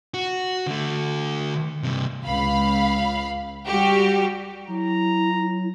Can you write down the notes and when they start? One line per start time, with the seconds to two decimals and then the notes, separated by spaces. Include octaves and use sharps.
0.14 F#4
0.67 D3 A3
1.83 G2 C3
2.25 C#2 F5 B5
3.66 G3 F#4 G4
4.68 F#3 E4 A#5